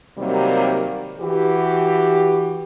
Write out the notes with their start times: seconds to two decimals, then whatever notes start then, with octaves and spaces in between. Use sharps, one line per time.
0.18 C3 D#3 F#3 G3 A#3
1.18 E3 F#4 G4